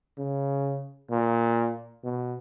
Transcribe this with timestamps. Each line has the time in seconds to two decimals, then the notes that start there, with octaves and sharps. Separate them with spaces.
0.18 C#3
1.11 A#2
2.04 B2